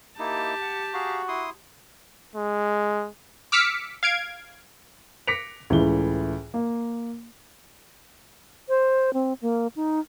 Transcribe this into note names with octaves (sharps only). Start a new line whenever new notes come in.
A#3 D#4 E4 G4 A5
F#5
F#4 G#4 F5 A#5
E4 C6 D#6
G#3
D6 E6 F6 B6 C#7
F5 G#6 D7
D6 A#6 B6 C#7 D7 F7
C#2 A2 E3 G7
A#3
C5
C4
A#3
D#4